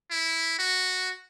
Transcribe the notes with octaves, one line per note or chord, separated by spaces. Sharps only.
E4
F#4